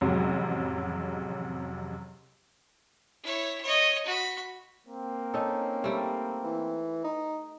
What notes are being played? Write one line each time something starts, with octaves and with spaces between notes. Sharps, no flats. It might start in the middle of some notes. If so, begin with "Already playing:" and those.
A1 F2 C3 F#3 G#3
E4 C#5
C#5 D#5
F#4 B5
A#3 C4
C#4 D#4 A4
G3 A3
E3
D#4